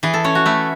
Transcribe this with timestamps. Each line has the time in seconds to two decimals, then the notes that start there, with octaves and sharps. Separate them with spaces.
0.03 E3 G#4
0.14 A4
0.24 C#4 C#5
0.35 F#4
0.46 A3 E4